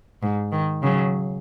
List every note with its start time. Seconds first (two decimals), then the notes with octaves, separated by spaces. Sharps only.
0.23 G#2
0.52 D#3
0.83 C#3 F#3